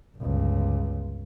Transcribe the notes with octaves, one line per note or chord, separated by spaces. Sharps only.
G1 C#2